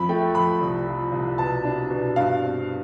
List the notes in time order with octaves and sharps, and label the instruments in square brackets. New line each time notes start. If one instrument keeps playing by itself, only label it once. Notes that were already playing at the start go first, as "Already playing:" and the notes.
Already playing: [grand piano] F2 B5
A3 G5
F2 B5
C2
F3
C2
B2 A5
D4
B2
G2 F5
C4